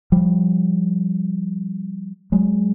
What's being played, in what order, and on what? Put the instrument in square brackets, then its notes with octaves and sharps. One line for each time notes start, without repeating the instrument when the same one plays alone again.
[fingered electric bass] F3 G3
F#3 G#3